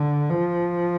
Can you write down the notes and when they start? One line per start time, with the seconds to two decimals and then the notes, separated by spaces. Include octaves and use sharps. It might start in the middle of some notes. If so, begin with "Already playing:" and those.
Already playing: D3
0.30 F3